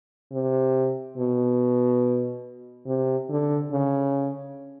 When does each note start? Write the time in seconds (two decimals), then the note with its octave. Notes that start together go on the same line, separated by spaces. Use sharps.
0.32 C3
1.18 B2
2.87 C3
3.30 D3
3.72 C#3